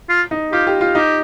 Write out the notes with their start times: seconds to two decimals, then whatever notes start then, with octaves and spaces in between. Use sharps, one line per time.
0.09 F4
0.31 D#4
0.52 F4 G4
0.67 G4
0.81 F4
0.95 D#4 G4